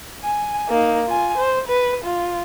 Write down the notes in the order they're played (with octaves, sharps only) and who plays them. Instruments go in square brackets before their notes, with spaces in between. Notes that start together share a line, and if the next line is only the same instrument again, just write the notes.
[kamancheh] G#5
A#3 D#4
F4 G#5
C5
B4
F4